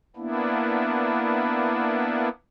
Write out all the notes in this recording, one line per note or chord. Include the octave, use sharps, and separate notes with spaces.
A#3 B3 D4 E4